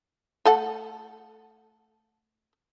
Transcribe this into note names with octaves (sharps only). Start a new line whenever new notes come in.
A3 A4 F#5